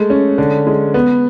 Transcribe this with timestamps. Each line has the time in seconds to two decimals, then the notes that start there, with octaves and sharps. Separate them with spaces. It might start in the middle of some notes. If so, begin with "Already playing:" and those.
Already playing: G#3 A3
0.10 C#4
0.38 D3
0.67 G#3
0.94 B3